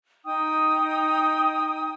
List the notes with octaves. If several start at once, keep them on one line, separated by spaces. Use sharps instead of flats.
D#4 G5 D#6